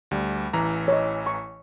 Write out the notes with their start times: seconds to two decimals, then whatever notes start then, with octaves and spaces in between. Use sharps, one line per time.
0.11 D2 G3
0.53 A1 E3 A#5
0.88 C#5 D#5
1.27 C#6